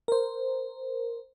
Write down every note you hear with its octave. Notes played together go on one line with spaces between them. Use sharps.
A#4 C5